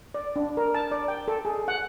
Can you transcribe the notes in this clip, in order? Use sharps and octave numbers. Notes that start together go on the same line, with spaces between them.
D5
D4
A#4
A5
D5
G5
A4
G#4
F#5